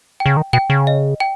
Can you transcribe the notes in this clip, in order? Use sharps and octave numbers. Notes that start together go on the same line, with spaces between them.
G5
C#3
D#3
B2 G5
C#3
D#5
G5